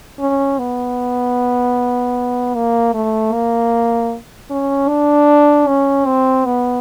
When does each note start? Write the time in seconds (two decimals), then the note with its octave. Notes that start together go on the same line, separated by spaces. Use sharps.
0.19 C#4
0.59 B3
2.54 A#3
2.94 A3
3.33 A#3
4.50 C#4
4.88 D4
5.68 C#4
6.06 C4
6.45 B3